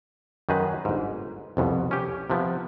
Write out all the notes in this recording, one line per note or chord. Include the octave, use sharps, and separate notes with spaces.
F#2 D#3 D#4 G#4 B4
G1 G#2
C2 F2 B2
C#4 G4
C3 F3 B3